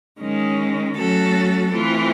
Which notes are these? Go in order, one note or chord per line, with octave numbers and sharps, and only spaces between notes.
D#3 G#3 C#4
F#3 A3 C#4 F#4 A4
E3 A3 C4 F4